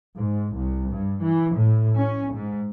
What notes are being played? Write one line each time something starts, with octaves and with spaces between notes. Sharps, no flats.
G#2
C2
G2
E3
A2
C#4
G#2